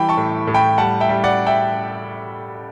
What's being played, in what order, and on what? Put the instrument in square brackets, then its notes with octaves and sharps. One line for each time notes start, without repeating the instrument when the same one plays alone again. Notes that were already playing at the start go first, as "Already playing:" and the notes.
Already playing: [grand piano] E3 G3 G5 B5
A5 C#6
A2
A2
G5 B5
G3 F#5 A5
E5 G5
G3
D5 F#5
E5 G5